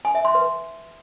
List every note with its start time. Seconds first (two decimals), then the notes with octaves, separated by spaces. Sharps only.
0.05 G#5
0.15 E5
0.25 C6
0.35 B4